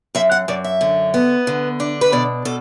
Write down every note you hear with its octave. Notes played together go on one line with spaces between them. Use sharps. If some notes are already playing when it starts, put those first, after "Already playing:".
F#2 E5
F#5
F#2 D5
E5
D3
B3
D3
D4
B4
B2 D5
B2 A4